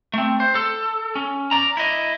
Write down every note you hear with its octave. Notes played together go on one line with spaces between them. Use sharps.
A3 C4
C5
A4
C#4
D5 A#5
E4 D#5